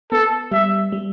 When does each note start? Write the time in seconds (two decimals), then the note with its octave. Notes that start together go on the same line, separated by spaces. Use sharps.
0.12 B3 A4
0.51 G3 E5
0.92 G3